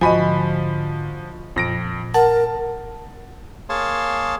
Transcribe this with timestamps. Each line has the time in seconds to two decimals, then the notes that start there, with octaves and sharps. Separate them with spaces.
0.01 G#2 D3 F3 F#4 D#5 G#5 B5
1.56 F2 A#2 A#6 D7
2.14 A#4 F#5 A5
3.69 A#3 G#4 C#5 F5 A5 C6